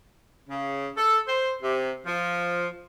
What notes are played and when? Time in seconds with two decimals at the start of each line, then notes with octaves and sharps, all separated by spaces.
0.48 C#3
0.97 A4
1.27 C5
1.61 C3
2.05 F3